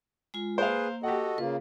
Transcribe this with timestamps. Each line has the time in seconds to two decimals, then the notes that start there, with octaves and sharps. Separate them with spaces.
0.34 G#3 F4
0.58 A#3 G#4 B4 C5 F5
1.03 F#4 G4 A4 D#5 F#5
1.38 C#3 A#3 F4 B4